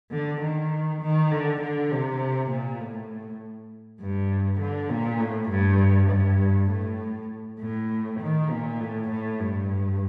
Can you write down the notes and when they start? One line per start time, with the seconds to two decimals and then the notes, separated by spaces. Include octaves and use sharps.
0.11 D3
0.41 D#3
1.02 D#3
1.32 D3
1.61 D3
1.92 C3
2.51 A#2
2.80 A2
4.01 G2
4.61 D3
4.91 A#2
5.21 A2
5.51 G2
6.11 G2
6.70 A2
7.60 A2
8.21 D#3
8.51 A#2
8.81 A2
9.10 A2
9.40 G2